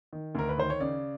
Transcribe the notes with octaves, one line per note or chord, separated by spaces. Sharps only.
D#3
D2 A#4
B4
D#3 C5
C#5
C#3 D5